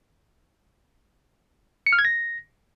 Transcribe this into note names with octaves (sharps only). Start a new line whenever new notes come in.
C#7
F6
G#6
A#6